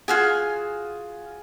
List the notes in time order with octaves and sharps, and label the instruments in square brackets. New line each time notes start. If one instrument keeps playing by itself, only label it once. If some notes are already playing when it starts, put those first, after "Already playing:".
[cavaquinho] F4 F#4 G#5 [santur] G#4